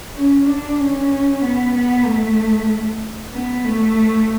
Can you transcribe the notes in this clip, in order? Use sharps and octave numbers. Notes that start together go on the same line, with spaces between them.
C#4
D4
C#4
B3
B3
A3
B3
A3